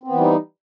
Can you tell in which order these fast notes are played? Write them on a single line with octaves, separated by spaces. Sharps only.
C4 B3 E3 G3 D#4